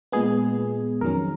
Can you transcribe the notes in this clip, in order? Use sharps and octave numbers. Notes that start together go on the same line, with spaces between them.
A#2 G#3 B3 G#4
F2 D#3 F#3 C#4 A#4